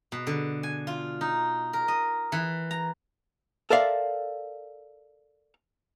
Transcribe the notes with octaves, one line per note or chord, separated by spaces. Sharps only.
B2
D3
G#5
F4
D#4
A#4
D#5
E3
A#5
A4 A#4 C5 D5 E5 F5